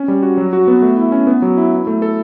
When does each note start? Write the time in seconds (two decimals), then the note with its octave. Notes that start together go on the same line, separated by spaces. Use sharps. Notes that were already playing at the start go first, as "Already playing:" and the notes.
Already playing: C#4
0.08 G3
0.23 F#4
0.37 F#3
0.53 F#4
0.68 B3
0.82 A3
0.97 E4
1.12 C#4
1.27 B3
1.42 F#3
1.57 E4
1.72 E4
1.87 A3
2.02 A4